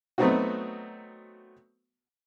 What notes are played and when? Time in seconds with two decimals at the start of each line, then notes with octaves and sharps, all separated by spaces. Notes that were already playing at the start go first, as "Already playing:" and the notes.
0.18 F#3 A3 B3 C4 D#4 F#4